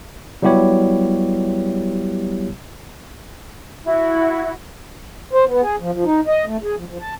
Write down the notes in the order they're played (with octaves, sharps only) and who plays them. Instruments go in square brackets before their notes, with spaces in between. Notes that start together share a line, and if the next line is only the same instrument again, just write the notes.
[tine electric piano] F#3 G3 B3 E4 G4 C#5
[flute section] E4 F#4
[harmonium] C5
B3
G#4
F3
F3
D#4
D#5
A3
G#4
F3
F3
A5